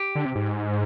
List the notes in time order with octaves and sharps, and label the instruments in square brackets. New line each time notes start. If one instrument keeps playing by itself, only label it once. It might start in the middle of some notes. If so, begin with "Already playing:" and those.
Already playing: [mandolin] G4
[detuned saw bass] D3
C3
G#2